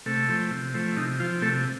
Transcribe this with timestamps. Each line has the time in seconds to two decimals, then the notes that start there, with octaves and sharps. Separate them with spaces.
0.06 C3 A3 A4
0.28 F3 A3 C4
0.51 C3
0.74 F3 A3 C4
0.97 C3 D#4
1.20 F3 C4 F4
1.42 C3 A3 A4